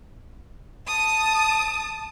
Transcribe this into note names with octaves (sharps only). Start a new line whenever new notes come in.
A5 D#6